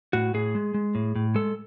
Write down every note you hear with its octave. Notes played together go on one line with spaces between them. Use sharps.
A2 F#4
A2 G#4
G#3
G#3
A2
A2
G#3 A4